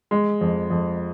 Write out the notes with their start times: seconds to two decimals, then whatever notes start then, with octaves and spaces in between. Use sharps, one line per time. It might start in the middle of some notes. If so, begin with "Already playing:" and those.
0.11 G#3
0.41 F2
0.70 F2